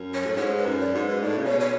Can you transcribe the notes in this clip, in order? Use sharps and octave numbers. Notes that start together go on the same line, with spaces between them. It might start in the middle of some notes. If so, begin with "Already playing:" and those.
Already playing: F#2
C#5
A2
G#2 C#5
B4
F#2
D5
G#2
B4
A2 D5
C#3
B2 C#5
C#5